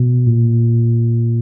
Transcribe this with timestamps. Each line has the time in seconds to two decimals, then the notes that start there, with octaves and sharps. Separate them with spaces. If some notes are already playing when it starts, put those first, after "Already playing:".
Already playing: B2
0.27 A#2